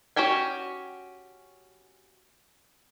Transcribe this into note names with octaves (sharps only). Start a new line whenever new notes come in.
C#4 F#4 G4 G5 G#5